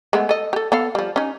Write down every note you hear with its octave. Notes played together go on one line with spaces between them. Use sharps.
G#3 A3 B3
A4 D#5
G4 A4
B3 A4 F5
F3 G3
C#4 D#4